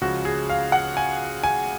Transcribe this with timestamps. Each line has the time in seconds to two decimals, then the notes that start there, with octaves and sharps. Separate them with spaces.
0.01 C#2 C#3 F3 F#4
0.25 G#4
0.50 F5
0.72 F#5
0.97 G#5
1.44 G#5